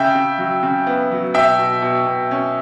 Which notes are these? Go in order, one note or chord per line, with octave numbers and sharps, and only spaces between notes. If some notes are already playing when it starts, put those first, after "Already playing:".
Already playing: C#3 E5 G5
C#3
F#3
C#3
B3
F#3
B2 E5 G5
B2
B2
B2
C#4